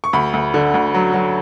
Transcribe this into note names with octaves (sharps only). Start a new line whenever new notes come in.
C#6
D2 B5
D2
D3
D2
F#3
F#3